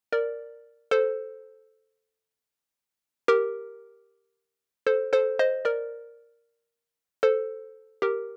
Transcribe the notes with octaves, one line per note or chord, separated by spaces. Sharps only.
A#4 D5
A4 C5
G4 A#4
A4 C5
A4 C5
C5 D#5
A#4 D5
A4 C5
G4 A#4